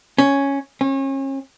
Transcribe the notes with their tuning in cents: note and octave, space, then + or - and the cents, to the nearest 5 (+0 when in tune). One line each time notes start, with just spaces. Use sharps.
C#4 +0
C#4 -35